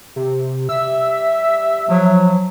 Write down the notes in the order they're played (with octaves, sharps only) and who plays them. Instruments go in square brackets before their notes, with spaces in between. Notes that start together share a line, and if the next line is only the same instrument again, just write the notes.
[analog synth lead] C3
[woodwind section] G3 G4 E5 [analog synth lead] E6
[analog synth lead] F3 [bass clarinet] F#3